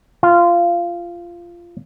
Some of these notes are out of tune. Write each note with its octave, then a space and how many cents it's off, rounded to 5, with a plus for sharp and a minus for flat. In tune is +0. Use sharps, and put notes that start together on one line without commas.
F4 -15